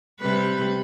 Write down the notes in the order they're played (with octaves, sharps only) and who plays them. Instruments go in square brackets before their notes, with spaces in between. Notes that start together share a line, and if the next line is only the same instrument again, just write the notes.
[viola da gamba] C3 G3 B4